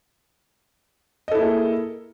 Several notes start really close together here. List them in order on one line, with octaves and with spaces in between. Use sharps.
D#5 A4 E4 A#3 G#4